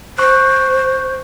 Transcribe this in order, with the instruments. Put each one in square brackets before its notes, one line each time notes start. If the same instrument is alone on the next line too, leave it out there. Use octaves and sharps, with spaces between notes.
[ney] C5 [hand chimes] C#6 F#6